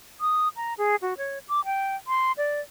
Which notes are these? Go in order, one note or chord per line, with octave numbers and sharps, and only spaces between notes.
D#6
A#5
G#4
F#4
C#5
D6
G5
C6
D5